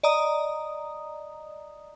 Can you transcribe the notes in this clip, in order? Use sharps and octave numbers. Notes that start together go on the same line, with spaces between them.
D5 D#5 A#5 D#6